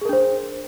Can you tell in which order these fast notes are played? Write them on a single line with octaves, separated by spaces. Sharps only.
G#4 A#4 D4 C5